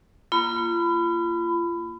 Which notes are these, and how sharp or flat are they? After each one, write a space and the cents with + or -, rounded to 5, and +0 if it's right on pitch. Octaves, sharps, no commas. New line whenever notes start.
A#3 +0 F4 -30 B5 +20